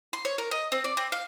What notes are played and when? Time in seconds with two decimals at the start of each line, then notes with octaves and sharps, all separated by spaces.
0.13 C6
0.25 C#5
0.38 A#4
0.51 D#5
0.72 C4
0.84 D5
0.97 C4
1.12 F5